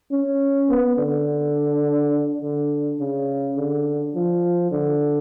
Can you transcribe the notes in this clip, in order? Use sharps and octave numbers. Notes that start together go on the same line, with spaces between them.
C#4
B3
D3
D3
C#3
D3
F3
D3